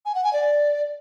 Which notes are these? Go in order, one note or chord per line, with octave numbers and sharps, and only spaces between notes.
G#5
F#5
G#5
D5